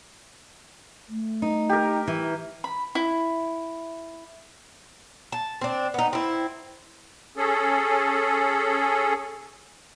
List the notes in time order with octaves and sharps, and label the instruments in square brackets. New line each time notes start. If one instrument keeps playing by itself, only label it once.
[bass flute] A3
[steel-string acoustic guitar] D#4
[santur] G4 A#4
[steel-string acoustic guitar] E3
[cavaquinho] B5
E4
[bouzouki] A5
C4 D4
B3 D#4
C4 E4
[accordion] C#4 G#4 A4